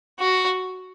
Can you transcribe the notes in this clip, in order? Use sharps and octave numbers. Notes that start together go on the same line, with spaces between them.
F#4